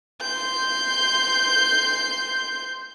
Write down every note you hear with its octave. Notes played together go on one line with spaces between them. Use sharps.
C6 G6